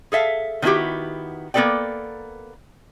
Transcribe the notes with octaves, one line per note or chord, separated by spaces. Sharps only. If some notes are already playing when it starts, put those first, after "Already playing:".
G#4 A4 E5 F5
D#3 A3 B3 E4 F#4 G4
A#3 B3 G#4 A4 D5 G5